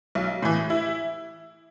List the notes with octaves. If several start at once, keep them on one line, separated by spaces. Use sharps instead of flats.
B1
A2 E3
E4